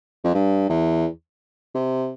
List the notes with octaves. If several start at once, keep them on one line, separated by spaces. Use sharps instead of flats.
F2
G2
E2
C3